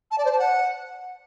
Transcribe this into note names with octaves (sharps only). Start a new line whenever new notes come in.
A5
D5
C5
A5
F#5